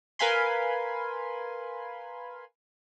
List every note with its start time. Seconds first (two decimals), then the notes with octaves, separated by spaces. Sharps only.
0.19 A#4 B4 F5 G#5 B5 C6